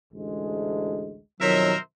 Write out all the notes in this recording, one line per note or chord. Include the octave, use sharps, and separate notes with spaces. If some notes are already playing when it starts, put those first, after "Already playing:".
A1 D2 G#3
F2 B2 D#3 F#3 A#4 C5 E5